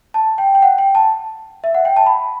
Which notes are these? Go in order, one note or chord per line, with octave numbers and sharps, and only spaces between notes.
A5
G5
G5
F#5
G5
A5
E5
F#5
G5
A5
B5